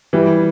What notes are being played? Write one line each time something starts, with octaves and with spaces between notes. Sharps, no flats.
E3 G3